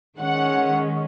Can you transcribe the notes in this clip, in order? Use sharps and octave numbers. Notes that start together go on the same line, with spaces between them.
D#3 G#3 C#4 F#5